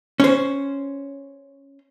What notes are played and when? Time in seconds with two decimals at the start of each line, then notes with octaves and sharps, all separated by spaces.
0.20 C#4 C5